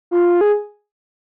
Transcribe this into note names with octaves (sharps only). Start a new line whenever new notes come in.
F4
G#4